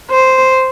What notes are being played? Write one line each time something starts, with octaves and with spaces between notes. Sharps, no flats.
C5